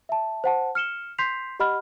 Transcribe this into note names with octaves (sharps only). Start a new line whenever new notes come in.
E5 A5
C5 F#5 A5
F6 C#7 E7 G7
C6 G6 B6 C7 F7
G4 D#5 F#5 B5 F6